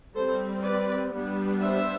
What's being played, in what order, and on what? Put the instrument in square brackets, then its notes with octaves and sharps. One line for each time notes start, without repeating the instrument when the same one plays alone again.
[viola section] G3 C4 A4 C5
B4 D5
G3 B3 D4
C5 E5